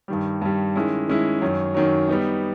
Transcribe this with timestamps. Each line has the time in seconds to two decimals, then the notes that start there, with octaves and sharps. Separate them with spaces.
0.08 G2 D#3 G3
0.41 G2 D#3 G3
0.76 D#3 G#3 C#4 E4
1.08 D#3 G#3 C#4 E4
1.41 F#2 D#3 F#3
1.74 F#2 D#3 F#3
2.09 G3 B3 D#4